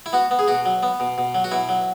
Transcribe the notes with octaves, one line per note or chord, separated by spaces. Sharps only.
E4
B3 F#4
B3
G#4
B2 F#4
F#3
B3
B2
B2
F#3
F#4
B2 E4
F#3